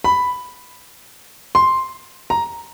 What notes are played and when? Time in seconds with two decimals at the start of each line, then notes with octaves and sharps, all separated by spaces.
0.04 B5
1.55 C6
2.30 A#5